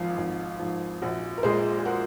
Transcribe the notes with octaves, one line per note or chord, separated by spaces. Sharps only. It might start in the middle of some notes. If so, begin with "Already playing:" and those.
Already playing: G#1 G#2 F3 F4
G#1
G#2 F3
A#1 F#4
A#4
A#2 G#3 G#4 C5
G#4
F#4 A#4